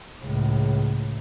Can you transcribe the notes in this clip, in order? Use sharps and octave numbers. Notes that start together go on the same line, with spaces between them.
C#2 A2